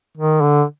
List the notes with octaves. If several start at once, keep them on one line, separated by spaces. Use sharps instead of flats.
D#3
D3